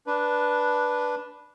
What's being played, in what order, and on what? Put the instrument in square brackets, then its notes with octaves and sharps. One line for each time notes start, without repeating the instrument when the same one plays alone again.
[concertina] D4 B4